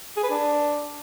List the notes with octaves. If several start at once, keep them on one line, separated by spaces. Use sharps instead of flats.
G#4
B4
D4